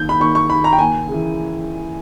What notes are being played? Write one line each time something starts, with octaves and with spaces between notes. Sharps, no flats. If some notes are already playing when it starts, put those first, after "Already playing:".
Already playing: D#2 D#3 G6
B5
D#2 C#6
C#6
D#3 B5
A#5
G5
D#2 G#5
C#3 E3